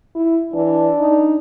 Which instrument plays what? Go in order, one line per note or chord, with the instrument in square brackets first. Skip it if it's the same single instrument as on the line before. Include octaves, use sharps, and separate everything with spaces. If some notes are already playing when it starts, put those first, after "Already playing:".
[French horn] E4
[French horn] E3 [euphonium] D4
[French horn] D#4